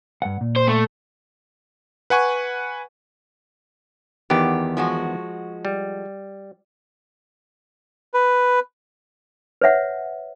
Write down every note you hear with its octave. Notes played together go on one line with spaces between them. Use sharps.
G2 F#5
A#2
C5
A3
B4 F#5 G#5 C#6
E2 D#3 B3 G4
F3 G#3 F#4
G3
B4
B4 C#5 E5 F#5